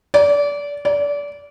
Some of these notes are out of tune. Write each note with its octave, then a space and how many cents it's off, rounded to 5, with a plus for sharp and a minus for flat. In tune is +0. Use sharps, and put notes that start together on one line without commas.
D5 -25
D5 -25